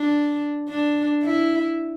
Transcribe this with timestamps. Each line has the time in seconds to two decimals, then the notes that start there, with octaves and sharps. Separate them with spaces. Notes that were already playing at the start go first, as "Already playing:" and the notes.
Already playing: D4
0.69 D4
1.23 E4